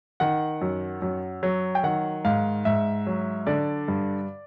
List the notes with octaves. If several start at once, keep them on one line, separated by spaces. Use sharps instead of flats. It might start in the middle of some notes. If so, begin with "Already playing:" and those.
D#3 F#5
F#2
F#2
F#3
G5
D#3 F#5
G#2 F5
G#2 E5
F#3
D3 D5
G2